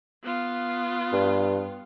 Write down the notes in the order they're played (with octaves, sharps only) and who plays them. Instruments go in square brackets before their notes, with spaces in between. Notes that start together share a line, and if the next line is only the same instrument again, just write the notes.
[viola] B3 F4
[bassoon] G2